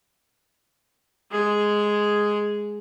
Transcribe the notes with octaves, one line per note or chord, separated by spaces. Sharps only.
G#3 G#4